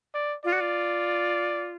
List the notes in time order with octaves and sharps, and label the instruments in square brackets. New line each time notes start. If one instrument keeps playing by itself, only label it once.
[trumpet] D5
[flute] F4 [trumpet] D5
[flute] F#4
F4